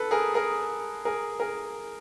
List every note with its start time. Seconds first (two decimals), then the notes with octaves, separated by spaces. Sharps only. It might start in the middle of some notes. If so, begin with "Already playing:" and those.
Already playing: A4 B4
0.11 G#4 A#4
0.34 G#4 A#4
1.05 G#4 A#4
1.40 G#4 A#4